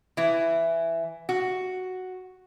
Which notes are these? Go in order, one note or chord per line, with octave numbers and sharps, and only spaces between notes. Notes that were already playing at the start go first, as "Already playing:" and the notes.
E3 E4
F#4